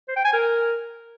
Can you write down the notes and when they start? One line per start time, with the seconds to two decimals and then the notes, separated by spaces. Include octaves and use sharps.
0.08 C5
0.16 G5
0.25 G#5
0.33 A#4